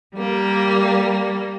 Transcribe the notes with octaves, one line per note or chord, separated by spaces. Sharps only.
G3 A#3